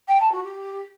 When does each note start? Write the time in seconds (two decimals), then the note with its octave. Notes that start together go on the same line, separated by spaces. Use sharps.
0.08 G5
0.20 A5
0.32 F#4
0.43 G4